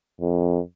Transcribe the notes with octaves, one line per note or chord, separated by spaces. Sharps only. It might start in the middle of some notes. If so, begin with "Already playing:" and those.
F2